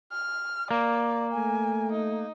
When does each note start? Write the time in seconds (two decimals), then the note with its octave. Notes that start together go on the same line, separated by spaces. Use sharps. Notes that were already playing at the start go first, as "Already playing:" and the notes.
0.12 F6
0.71 A#3 D5
1.32 A3 G#5
1.92 D#4